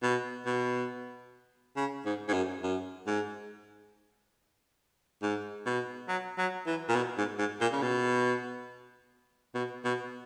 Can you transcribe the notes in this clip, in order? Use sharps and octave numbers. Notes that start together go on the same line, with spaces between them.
B2
B2
C#3
G#2
G#2
F#2
F#2
G#2
G#2
B2
F#3
F#3
E3
A#2
B2
G#2
G#2
A#2
C#3
B2
B2
B2